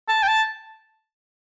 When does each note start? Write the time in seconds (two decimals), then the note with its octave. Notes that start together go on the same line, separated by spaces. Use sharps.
0.09 A5
0.23 G5
0.28 A5